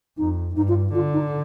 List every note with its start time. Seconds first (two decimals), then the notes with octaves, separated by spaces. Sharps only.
0.18 F2 D#4
0.56 G2 D#4
0.68 F4
0.94 D3 F4
1.13 D#4